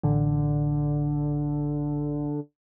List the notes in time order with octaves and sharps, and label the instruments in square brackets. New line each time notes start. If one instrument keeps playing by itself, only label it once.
[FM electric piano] A1 [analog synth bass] D3